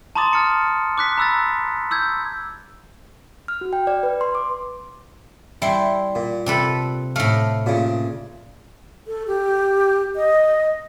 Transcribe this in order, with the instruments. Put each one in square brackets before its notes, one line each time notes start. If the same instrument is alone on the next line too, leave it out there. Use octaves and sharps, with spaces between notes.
[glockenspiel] A5 A#5 C6 D6 D#6 A6
F6 A6 C#7
D6 F#6 B6
A#5 B5 E6 F#6 A6
D6 E6 G6 G#6
[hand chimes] F6
F#4
G5
D5
B4
C6
D6
[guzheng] G3 C6 [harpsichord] E4
[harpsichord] A#2
[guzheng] C3 A4 B4
[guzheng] A2 A3 [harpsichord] F5
[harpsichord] A#2 C#3
[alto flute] A4
G4
D#5